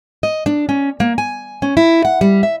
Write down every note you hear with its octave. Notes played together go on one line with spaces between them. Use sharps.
D#5
D4
C#4
A#3
G#5
C#4
E4
F#5
G3
E5